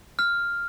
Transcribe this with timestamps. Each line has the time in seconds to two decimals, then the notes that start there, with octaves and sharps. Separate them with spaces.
0.19 F6